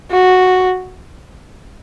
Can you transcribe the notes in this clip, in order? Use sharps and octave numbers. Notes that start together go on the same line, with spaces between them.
F#4